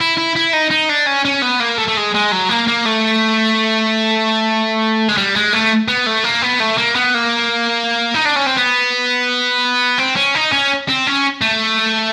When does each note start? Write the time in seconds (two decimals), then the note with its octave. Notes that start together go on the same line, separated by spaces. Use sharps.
0.01 E4
0.18 E4
0.36 E4
0.54 D#4
0.71 D#4
0.90 D4
1.07 C#4
1.25 C#4
1.42 B3
1.60 A#3
1.78 A3
1.88 A3
1.97 G#3
2.15 G#3
2.32 F#3
2.50 A#3
2.68 A#3
2.86 A3
5.09 G#3
5.17 G3
5.36 G#3
5.53 A3
5.88 B3
6.07 A3
6.24 A#3
6.42 B3
6.60 A3
6.78 A#3
6.95 B3
7.14 A#3
8.14 D#4
8.25 D4
8.36 C#4
8.46 C4
8.56 B3
9.98 C4
10.17 C#4
10.35 D#4
10.52 C#4
10.88 C4
11.07 C#4
11.42 A3